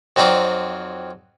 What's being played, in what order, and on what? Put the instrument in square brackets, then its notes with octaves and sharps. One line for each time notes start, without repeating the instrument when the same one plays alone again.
[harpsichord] F2 F#3 C4 D#4 F4 D5